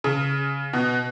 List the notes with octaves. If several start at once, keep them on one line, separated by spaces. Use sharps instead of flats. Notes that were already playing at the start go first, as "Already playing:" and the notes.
C#3
B2